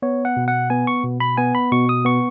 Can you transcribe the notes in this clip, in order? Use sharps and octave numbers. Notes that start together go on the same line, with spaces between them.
B3 C#5
F#5
B2
F#5
B3 G#5
C#6
B2
B5
B3 G#5
B5
B2 C#6
D#6
B3 C#6